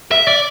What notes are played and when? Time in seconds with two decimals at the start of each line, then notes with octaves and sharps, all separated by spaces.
0.11 E5
0.27 D5